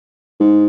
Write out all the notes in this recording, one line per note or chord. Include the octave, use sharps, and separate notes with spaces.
G#2